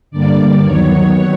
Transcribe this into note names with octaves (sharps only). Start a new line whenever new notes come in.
G2 D3 G3 A#3 D5
D#2 D#3 F#3 B3 C#5